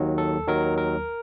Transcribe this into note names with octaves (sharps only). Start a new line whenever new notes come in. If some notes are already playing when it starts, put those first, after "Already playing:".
Already playing: D#2 D#3 F#3
A4
D#2 D#3 F#3 A#4
A#4